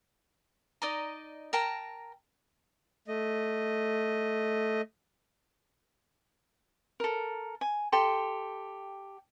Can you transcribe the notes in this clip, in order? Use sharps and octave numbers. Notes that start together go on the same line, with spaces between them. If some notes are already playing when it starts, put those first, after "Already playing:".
D#4 D5 D#5 A#5
A#4 G5 A5 A#5
A3 D#5
A4 A#4
G#5
G4 A4 G5 C6